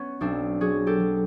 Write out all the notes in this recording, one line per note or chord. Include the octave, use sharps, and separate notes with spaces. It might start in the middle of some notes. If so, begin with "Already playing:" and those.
Already playing: B3 C#4
B1 C4 D4
F#3 F#4 G#4
G4 A4
F#3